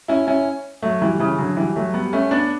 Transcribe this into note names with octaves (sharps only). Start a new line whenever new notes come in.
C#4 E4
C#4 E4
F#3 A3
E3 G3
C#3 E3
D3 F#3
E3 G3
F#3 A3
G3 B3
A3 C#4
B3 D4